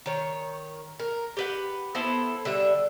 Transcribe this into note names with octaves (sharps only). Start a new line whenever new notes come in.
D#3 C#5
A#4
G4 B4 F#5
B3 E4 A4 C5
D3 G3 E5